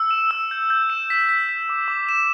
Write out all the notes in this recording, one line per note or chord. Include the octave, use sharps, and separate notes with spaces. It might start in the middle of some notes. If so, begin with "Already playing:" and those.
Already playing: E6
E7
E6
G6
G6
E7
B6
B6
B6
D6
D6
E7